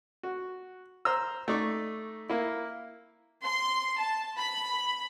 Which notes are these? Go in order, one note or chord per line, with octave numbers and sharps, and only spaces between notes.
F#4
C5 A#5 E6
A3 D#4 D5 C#6
A#3 E4
C6
A5
B5